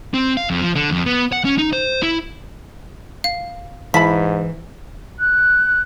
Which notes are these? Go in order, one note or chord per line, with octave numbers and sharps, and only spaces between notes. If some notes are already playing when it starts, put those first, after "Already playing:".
C4
F5
F2
F3
D3
F2
B3
F#5
C#4
D#4
C5
E4
F5
G#2 E3 E4 A5 B5 B6
F#6